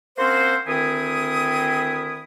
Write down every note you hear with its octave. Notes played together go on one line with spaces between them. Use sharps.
A#3 C4 C#4 F#4 C5
D2 D#3 C4 E4 G#5 D#6